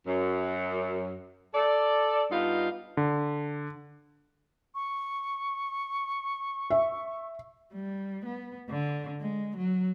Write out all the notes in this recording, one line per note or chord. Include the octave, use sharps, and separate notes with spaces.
F#2
A4 D5
G2 B3 D#4 F4 F5
D3
C#6
E5
G3
B3
D3
G#3
F#3